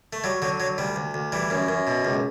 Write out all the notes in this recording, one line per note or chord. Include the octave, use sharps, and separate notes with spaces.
A3
F#3 G3
D3 F#3
F#3
D2 G3
D2
D2
E3 G3
F#2
F#2
B2
C#2